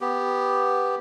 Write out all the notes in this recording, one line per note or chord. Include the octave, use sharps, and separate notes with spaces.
B3 G4